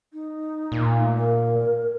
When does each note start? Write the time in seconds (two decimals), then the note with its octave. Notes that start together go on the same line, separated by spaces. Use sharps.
0.13 D#4
0.72 A#2
0.98 A3
1.15 A#4